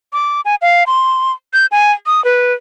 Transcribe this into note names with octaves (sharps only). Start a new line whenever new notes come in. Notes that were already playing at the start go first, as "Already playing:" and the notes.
D6
G#5
F5
C6
G6
G#5
D#6
B4